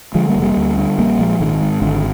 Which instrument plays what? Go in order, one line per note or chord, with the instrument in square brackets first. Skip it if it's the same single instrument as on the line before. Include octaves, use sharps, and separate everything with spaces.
[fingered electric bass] D3 F3 G#3
G3 A#3
F1
G3 A#3
D2
D3
A#1 G3 A#3
A#2 F3 G#3
G#1 D#3
G#2
G#1 D3